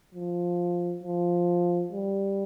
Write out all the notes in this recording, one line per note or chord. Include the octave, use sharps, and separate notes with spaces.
F3
F3
G3